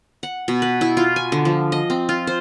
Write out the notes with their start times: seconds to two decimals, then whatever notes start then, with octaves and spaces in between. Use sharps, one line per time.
0.23 F#5
0.48 B2
0.62 B4
0.81 E4
0.97 F4
1.16 G#5
1.32 D3
1.45 F3
1.72 D#5
1.90 C4
2.09 F4
2.27 C5